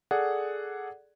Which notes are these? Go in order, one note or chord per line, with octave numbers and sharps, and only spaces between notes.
G#4 A4 D5 F#5